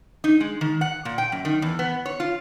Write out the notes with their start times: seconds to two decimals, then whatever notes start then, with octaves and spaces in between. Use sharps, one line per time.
0.24 D#4
0.41 G#3
0.61 D#3
0.81 F#5
1.05 A#2
1.18 G5
1.32 F#2
1.45 D#3
1.62 E2
1.79 B3
2.06 C#5
2.20 F4